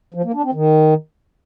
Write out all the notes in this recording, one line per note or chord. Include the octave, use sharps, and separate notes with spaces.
F3
A#3
D4
C4
D#3